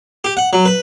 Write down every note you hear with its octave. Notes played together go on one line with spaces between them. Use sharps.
G4
F#5
F#3
B4